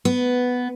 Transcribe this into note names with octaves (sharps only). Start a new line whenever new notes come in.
B3